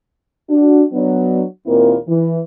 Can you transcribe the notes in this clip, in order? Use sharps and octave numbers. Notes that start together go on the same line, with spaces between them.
D4 F#4
F#3 B3 D4
D#2 A#2 A#3 C4 E4 A#4
E3